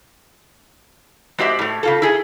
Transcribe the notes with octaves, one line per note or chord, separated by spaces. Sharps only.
G#3 C4 F#4 G4 D5 E5
A2 A3
C#3 F4 A4
E4 G#4 A4